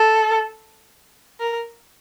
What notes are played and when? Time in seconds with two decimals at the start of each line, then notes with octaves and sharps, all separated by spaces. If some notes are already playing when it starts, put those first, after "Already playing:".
Already playing: A4
1.40 A#4